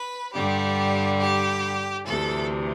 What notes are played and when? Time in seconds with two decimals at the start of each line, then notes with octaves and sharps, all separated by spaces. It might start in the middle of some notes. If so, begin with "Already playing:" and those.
Already playing: B4
0.33 G2 D3 G3 G4
1.19 G4
2.06 D2 C3 E3 A4